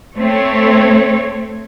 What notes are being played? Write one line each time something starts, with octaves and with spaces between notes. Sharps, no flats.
A3 C4 C#5